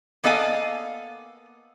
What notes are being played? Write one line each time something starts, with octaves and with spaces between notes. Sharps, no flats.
A#3 B3 A4 D#5 F5 G#5